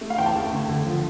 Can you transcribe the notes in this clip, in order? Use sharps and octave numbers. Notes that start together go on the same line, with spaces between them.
A3
F5
E2 G5
A5
A3
D3
D3
F3